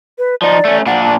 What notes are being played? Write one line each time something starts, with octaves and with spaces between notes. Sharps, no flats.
B4
F3 D#4 D5
A3 C#4
A#2 D4 F#5
A5